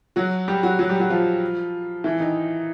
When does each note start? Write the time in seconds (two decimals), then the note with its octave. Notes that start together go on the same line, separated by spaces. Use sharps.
0.16 F#3 F#4
0.48 G3 G4
0.63 F#3 F#4
0.79 F#3 F#4
0.89 G3 G4
1.00 F#3 F#4
1.10 F3 F4
2.04 E3 E4
2.20 D#3 D#4